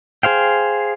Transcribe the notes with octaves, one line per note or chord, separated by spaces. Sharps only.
G#4 C5 F5 G5